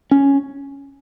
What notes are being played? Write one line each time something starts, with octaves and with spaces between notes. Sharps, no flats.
C#4